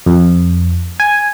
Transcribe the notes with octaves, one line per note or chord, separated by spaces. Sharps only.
F2
G#5